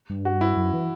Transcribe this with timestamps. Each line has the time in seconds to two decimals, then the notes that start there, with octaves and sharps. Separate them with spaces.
0.10 G2
0.25 F#4
0.41 E4
0.57 F#2
0.73 E3